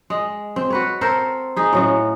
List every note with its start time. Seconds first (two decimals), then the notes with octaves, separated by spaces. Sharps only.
0.10 G#3
0.56 C4
0.70 F#4 B4 C#5
1.01 C4 A4 A#4 C5
1.56 D#4 G#4
1.73 A2 F#3 C#4